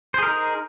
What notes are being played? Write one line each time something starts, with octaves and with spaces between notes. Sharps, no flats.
D#4 G#4 A#4 C5